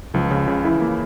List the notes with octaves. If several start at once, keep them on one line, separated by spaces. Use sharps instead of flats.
C#2 F3
C#3
C#3
E3 E4
A#3